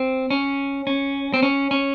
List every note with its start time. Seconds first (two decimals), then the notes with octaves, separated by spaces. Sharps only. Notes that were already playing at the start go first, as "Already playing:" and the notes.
Already playing: C4
0.30 C#4
0.87 C#4
1.34 C4
1.43 C#4
1.71 C#4